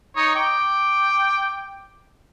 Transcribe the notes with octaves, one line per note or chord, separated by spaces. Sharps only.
D#4 C#5 D#5
G5 D6